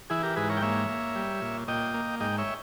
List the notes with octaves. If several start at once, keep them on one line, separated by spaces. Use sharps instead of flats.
E3 E4 G#4
G4 A#4
G#2 G#4 B4
A#4 C#5
G5
A#3 C#5 E5
A#3
G3
A#2
A#2 D#5 G5
A#3
G#2 D#5 G5
C#5 E5